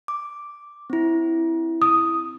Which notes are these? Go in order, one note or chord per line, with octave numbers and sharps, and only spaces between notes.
D6
C4 E4
D#6